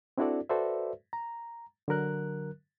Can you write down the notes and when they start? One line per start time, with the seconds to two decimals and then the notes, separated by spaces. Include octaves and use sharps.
0.18 C4 D4 E4 F#4 A4 D5
0.49 F#4 A4 B4 C5 D5 E5
1.13 A#5
1.88 D3 F#3 A#4 F#6